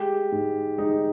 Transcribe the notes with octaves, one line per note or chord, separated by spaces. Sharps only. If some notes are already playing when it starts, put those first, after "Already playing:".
Already playing: G#3 G4
G#2
G#3 D#4